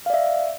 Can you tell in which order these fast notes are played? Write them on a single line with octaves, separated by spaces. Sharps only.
F5 D5 E5